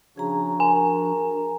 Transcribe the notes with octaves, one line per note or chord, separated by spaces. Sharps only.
C#3 F3 D4 F#4 G#4 A#5
A#4 G#5